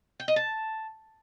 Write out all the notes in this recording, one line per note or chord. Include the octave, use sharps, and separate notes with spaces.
G5
D#5
A5